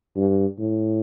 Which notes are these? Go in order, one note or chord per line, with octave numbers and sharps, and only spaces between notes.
G2
A2